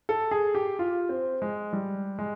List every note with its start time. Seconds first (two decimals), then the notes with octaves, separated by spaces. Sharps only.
0.09 A4
0.31 G#4
0.55 G4
0.79 F4
1.09 C4
1.42 G#3
1.73 G3
2.19 G#3